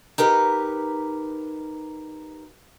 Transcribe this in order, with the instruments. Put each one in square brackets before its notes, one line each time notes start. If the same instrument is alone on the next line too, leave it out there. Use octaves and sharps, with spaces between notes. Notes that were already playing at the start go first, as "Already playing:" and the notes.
[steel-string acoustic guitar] D#4 G4 A#4 B4